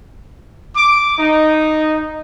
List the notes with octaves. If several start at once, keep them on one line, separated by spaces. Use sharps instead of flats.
D6
D#4